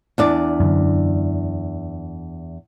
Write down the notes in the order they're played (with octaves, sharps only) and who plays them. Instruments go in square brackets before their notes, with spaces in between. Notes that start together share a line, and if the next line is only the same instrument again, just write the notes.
[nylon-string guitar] E2 D4 D5
[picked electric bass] F#2 D3